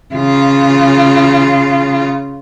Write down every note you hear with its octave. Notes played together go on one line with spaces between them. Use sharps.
C#3 F4